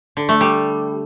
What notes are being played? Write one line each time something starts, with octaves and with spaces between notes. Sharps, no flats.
D3
A3
G3